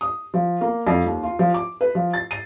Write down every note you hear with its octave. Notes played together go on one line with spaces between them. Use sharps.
D#6
F3
A#3
F2
D#2
F4
F3
D6
B4
F3
A6
D#7